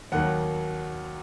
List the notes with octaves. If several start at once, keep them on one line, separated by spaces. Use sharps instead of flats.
D#2 D#3 F#3 F#5